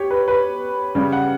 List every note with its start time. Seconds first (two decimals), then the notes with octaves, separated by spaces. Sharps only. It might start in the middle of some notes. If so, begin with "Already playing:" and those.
Already playing: G4 C#5
0.10 B4
0.28 B4
0.95 C#3 G3
1.12 F#5